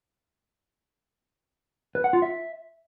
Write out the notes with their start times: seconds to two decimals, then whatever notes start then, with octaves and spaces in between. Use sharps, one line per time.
1.95 B4
2.04 F#5
2.13 F4
2.22 E5